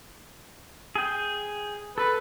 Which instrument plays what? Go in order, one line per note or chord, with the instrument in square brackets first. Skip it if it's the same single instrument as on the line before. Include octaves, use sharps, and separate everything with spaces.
[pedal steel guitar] G#4 G5
[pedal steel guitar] A4 [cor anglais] B4